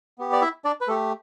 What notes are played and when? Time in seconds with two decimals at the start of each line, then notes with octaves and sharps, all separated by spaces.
0.18 B3 G4
0.33 D5
0.41 E4 E5
0.65 D4 D5
0.81 B4
0.88 A3 G4 A4